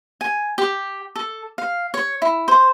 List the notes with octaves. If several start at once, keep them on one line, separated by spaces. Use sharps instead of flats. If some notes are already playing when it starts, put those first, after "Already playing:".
G#5
G4
A4
F5
C#5
E4
C5